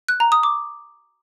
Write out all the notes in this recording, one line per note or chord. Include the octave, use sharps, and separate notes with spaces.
F#6
A#5
D#6
D6